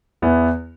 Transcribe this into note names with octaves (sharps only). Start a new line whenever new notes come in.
E2 E3 B3 E4